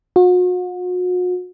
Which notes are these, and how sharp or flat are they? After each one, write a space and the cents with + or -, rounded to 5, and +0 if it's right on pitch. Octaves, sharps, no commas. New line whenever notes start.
F#4 -40